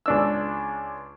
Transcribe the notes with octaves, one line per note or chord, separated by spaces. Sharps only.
C#2 D4 E6